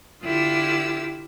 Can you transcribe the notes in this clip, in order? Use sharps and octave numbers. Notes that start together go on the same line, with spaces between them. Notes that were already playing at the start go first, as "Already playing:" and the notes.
D3 E4 F4 G4 E6